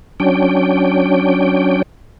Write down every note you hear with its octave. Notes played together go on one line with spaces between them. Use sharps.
F#3 C#4 D4 G5